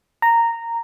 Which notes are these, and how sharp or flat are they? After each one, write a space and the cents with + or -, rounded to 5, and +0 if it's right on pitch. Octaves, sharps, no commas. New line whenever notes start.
A#5 -10